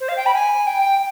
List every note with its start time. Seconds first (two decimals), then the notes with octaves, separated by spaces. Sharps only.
0.01 C5
0.09 F5
0.17 G5
0.26 B5
0.34 G#5
0.67 G5